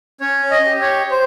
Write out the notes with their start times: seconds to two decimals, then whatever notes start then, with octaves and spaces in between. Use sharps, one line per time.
0.21 C#4 C#5
0.51 D#5
0.66 G4
0.81 C#5
1.11 C5